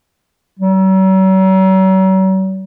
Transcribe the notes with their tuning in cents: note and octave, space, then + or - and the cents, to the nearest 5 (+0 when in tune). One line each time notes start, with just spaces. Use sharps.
F#3 +45